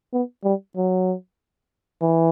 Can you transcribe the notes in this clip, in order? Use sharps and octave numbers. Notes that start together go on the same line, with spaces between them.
B3
G3
F#3
E3